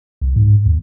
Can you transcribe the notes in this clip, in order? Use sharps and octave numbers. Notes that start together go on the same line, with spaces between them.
C2
G#2
D#2